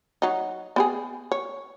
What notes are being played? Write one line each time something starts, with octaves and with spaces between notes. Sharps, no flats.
F#3 D#4
B3 G4 G#4
C#5